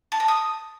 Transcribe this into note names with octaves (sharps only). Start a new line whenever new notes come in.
A5
A#5
D#6